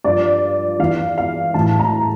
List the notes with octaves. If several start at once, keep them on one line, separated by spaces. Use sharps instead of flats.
G2 F3 D5
E2 E3 F5
F5
A2 E3 A5
A#5